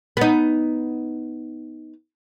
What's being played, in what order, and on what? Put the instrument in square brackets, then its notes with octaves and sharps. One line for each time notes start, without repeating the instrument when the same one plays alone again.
[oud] B3 D#4